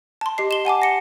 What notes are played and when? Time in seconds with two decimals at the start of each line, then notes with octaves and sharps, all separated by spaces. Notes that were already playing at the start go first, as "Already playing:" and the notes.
0.21 A5 C6
0.38 G4 D#5 C7
0.51 E7 G7
0.65 F#5 G#5 A5 D6
0.82 A#6 C#7